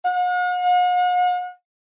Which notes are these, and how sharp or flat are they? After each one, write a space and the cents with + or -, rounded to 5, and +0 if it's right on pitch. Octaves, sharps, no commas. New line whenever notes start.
F#5 -45